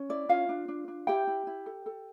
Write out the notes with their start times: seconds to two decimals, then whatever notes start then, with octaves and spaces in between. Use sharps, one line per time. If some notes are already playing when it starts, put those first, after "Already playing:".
Already playing: C#4
0.09 E4 D5
0.29 C#4 F4 F5
0.49 D4
0.68 D4
0.88 D4
1.07 E4 G4 G5
1.27 E4
1.47 E4
1.66 A4
1.86 A4